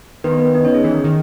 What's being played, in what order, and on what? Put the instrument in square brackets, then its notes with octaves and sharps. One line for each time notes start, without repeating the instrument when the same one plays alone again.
[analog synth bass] D#3 [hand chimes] B3 B4
[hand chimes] B3 B4
D#4 D#5
C#4 C#5
G#4
[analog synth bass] E3
D#3
D#3